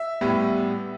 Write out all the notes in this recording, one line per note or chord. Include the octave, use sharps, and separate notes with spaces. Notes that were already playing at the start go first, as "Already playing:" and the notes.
Already playing: E5
A2 G3 B3 E4